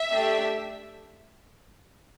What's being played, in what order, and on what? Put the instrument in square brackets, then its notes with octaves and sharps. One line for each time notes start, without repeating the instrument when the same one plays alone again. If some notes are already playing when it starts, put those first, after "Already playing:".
Already playing: [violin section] E5
A3 D4 G4